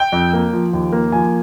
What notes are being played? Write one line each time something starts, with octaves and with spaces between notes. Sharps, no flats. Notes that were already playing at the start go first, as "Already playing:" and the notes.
Already playing: G5
F2
A#3
F3
D#2
A#3
F3 G#5